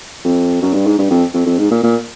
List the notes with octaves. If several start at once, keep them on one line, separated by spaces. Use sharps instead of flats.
F2
F#2
G2
G#2
G2
F2
F2
F2
G#2
A#2
A#2